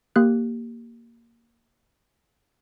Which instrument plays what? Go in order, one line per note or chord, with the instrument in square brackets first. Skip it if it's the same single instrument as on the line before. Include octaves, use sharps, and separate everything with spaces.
[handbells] A#3 G4 F#6